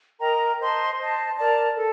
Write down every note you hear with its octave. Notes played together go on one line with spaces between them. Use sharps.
A#4 D#5 G5 A#5
C5 D#5 A5 C6
C5 D#5 A5
A#4 D5 A5
A4